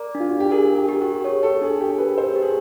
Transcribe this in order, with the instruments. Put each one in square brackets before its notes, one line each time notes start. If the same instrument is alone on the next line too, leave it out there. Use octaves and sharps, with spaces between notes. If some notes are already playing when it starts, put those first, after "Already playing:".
Already playing: [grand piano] A#4 [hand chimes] D5
[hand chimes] D4
[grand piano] F4
F#4
G4
[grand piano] G#4 [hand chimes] A#4
[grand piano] G4
[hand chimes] G4
[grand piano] F#4
[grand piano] G#4 [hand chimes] C#5
[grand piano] A4
[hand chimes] D4 [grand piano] G#4
[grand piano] G4
[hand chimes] A#4 [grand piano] B4
[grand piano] C5
[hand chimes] G4
[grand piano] G#4